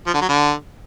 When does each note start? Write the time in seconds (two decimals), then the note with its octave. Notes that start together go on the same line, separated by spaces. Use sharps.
0.07 F3
0.14 D3
0.22 F#3
0.29 D3